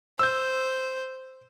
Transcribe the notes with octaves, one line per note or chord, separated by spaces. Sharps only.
C5 E6 G6